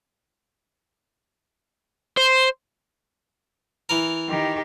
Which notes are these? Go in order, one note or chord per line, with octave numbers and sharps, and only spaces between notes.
C5
E3 A#4
D#3 G4